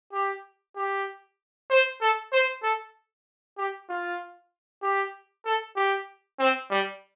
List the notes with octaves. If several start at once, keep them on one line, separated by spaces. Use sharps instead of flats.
G4
G4
C5
A4
C5
A4
G4
F4
G4
A4
G4
C4
G3